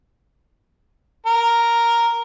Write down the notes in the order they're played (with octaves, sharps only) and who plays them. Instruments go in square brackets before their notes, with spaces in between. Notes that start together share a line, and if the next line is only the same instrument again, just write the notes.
[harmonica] A#4